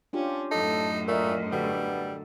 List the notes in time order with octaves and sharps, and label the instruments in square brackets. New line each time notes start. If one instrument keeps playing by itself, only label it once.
[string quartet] C#4 [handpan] D4 F4 G4
[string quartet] F#2 A2 [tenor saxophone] D#4 [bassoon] A4
[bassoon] A#2 [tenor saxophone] A3 [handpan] A#4 D#5
[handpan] D3 F#4 A4 [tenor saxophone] G3 [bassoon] B3